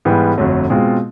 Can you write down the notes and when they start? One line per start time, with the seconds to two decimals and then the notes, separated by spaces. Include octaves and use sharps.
0.05 G#2 E3 G3 B3
0.38 G1 F2 D3 F#3 A3
0.70 B2 G#3 C4 F4